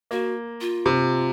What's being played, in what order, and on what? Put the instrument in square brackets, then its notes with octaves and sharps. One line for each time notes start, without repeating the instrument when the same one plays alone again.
[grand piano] A#3 [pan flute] F#4
[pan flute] F4
[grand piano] C3